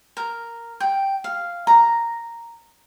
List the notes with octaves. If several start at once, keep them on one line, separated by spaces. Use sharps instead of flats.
A#4
G5
F5
A#5